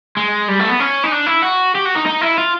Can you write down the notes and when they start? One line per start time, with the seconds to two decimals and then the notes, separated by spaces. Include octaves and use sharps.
0.17 G#3
0.48 G3
0.59 A3
0.69 B3
0.80 C#4
1.04 D#4
1.12 D4
1.27 E4
1.42 F#4
1.75 G4
1.85 F#4
1.95 D#4
2.06 D#4
2.21 E4
2.38 F4